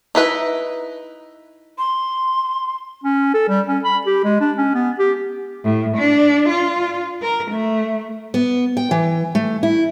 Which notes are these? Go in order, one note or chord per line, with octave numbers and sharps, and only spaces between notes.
D#4 E4 B4
C6
C#4
A4
G3
C#4
B5
G4
G#3
D4
C#4
B3
G4
A2
D4
F4
A#4
A3
B3
G5
E3
A3
E4